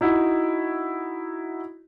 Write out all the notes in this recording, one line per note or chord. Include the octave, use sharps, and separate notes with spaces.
D#4 E4 F#4